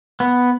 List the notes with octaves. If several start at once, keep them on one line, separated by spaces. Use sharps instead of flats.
B3